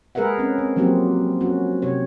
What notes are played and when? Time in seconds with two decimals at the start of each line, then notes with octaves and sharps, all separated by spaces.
0.15 G#3 G#4 A#4 B4 E5 F#5
0.38 C4 C#4
0.58 C4
0.76 F3 F#3 A#3 C4 F#4 G4
1.41 C#4 F#4
1.82 C3 G4 C#5